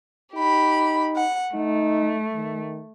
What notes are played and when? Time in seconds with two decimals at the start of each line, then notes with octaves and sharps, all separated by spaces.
0.35 D#4 G4 B5
1.16 F#5
1.54 A3 D#4
2.35 D#3